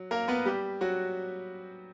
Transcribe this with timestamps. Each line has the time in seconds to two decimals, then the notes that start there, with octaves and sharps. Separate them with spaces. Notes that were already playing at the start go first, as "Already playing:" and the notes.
Already playing: F#3
0.11 A#3 A#4
0.28 B3 B4
0.46 G3 G4
0.81 F#3 F#4